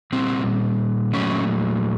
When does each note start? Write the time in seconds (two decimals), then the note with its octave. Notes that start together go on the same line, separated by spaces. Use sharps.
0.12 A#2 G3 C4
1.13 A#2 F#3 A3 C#4